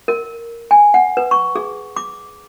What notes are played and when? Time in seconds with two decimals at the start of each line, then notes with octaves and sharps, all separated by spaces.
0.08 A#4
0.71 G#5
0.94 F#5
1.17 B4
1.31 C#6
1.56 G#4
1.96 D6